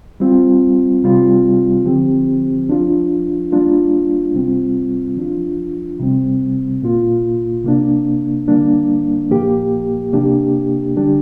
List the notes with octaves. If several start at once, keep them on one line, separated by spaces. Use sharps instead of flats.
G3 C4 F4
C3 G3 C4 F4
D3 F3 C4 G4
F3 D4 F4
G3 A#3 D4 F4
C3 G3 C4 F4
F3 D4 F4
C3 G3 C4
A#2 A#3 F4
C3 A#3 D4
D3 G3 A#3 D4
A#2 F3 A#3 G4
C3 A#3 D4 G4
D3 G3 D4 G4